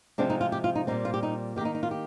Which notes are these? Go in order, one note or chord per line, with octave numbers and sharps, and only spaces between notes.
C3 F3 G#3 C4 D4
D#4
F4
G4
F4
D#4
A#2 G3 C4 D#4
F4
G4
D#4
D#3 A#3 D#4 G4
D#4
F4
G4